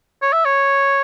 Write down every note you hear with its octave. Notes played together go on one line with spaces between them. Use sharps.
C#5
E5
C#5